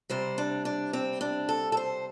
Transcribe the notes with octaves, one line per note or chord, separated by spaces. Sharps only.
C3 G3 C5
D4
D4
C4
D4
A4
A4
C5